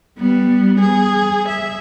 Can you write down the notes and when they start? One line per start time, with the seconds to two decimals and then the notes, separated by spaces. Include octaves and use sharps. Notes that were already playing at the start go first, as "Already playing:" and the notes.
0.18 G3 B3
0.81 G#4
1.49 E5